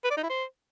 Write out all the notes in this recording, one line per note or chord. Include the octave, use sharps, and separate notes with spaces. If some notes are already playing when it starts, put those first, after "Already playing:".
B4
D5
D#4
E4
C5